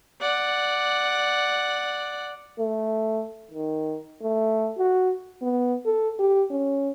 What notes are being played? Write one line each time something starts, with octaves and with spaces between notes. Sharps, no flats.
D5 F#5
A3
D#3
A3
F#4
B3
A4
G4
C#4